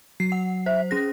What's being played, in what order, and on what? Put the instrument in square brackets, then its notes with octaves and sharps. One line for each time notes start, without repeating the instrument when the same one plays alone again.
[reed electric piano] F#3 [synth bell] C7
[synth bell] F#5
[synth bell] C5 [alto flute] E5
[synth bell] C#4 A#6 [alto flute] G#4